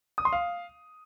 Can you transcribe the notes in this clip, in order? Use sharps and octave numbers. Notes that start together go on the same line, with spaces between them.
D#6
C6
F5